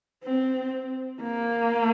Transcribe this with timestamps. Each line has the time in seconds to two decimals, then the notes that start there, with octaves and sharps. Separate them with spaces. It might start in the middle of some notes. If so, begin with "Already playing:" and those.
0.24 C4
1.21 A#3